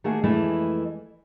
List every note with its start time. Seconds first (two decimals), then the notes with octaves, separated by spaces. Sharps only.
0.04 D#3 A3 A#3 F#4 G#4 E5
0.23 F2 E3 G#3 A3 E4